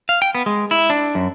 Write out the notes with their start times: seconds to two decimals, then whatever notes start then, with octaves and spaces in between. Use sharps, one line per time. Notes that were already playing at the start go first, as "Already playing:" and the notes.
0.09 F5
0.22 G5
0.35 B3
0.46 G#3
0.71 E4
0.90 D4
1.15 F#2